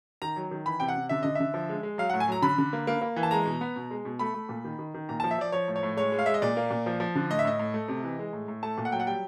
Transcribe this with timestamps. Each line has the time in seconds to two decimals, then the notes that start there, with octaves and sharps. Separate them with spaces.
0.22 D#3 A#5
0.36 F#3
0.51 D#3
0.66 E3 B5
0.80 C3 G5
0.88 F#5
0.96 C3
1.09 D3 E5
1.23 D3 D#5
1.35 D3 E5
1.54 F3
1.69 G#3
1.83 G#3
1.98 F#3 F5
2.10 F#5
2.14 A2
2.20 G#5
2.28 F#3 A#5
2.42 D3 B5
2.58 D3
2.73 A#3
2.87 A#3
3.02 A#3
3.16 E3
3.23 A5
3.31 G#3 A#5
3.46 B2
3.61 B3
3.76 B2
3.91 G#3
4.05 B2
4.19 A3 B5
4.34 A3
4.49 A#2
4.64 D#3
4.79 D#3
4.94 D#3
5.09 A#2 A#5
5.20 A5
5.24 F3
5.31 E5
5.38 F3 D5
5.52 F3 C#5
5.68 A2
5.76 C#5
5.83 A2
5.97 G#3 C#5
6.12 G#3
6.19 F5
6.26 G#3 E5
6.34 D#5
6.42 A#2 D5
6.57 A#3
6.71 A#2
6.86 F3
7.00 F3
7.15 D3
7.30 A2 D#5
7.39 E5
7.45 A2 D#5
7.59 A2
7.74 A3
7.88 C3
8.04 E3
8.19 G#3
8.33 A2
8.48 A2
8.63 A3 A5
8.78 A#2
8.85 F#5
8.92 F#3 G5
9.00 F#5
9.07 G3 G5